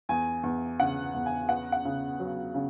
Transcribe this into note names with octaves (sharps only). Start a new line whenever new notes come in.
E2 G#5
E2
C#3 F#5
E2
G#5
B3 F#5
F#5
C#3
F#3
C#3